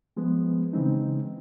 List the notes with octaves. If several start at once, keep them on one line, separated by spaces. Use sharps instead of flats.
F3 G#3 B3
C#3 E3 G#3 C4 D#4